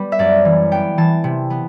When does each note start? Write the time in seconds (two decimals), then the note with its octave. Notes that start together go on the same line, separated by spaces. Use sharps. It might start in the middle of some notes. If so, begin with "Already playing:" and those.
Already playing: G3 B3 B4
0.12 E5
0.19 F#2 D5
0.45 E3
0.71 B3 G5
0.98 E3 A5
1.24 C3
1.50 B3